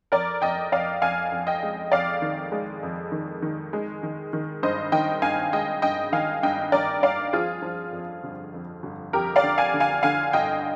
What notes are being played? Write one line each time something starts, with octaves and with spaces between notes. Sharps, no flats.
F2 A#4 D5
F2 D#5 G5
F2 D5 F5
F2 F5 G#5
F2
D#5 G5
G#3
F2 D5 F5
D#3
G#3
F2
D#3
D#3
G#3
D#3
D#3
G2 C5 D#5
D#3 D#5 G5
G2 F5 G#5
G#3 D#5 G5
G2 D#5 G5
D#3 F5 G#5
G2 D#5 G5
G2 A#4 D5
G2 D5 F5
F3 F4 G#4
F3
F2
G1
F2
G1
F2 G4 A#4
D5 F5
D3
F5 G#5
D3
F5 G#5
D3 F5 G#5
G1 D#5 G5